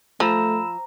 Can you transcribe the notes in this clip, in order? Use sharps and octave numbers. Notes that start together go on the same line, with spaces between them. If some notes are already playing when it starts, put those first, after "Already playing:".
F3 A3 A#5 B5 E6 E7